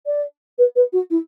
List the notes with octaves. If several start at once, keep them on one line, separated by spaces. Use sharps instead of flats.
D5
B4
B4
F#4
E4